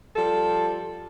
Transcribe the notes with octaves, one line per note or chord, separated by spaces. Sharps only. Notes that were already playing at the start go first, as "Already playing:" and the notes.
F3 G3 A4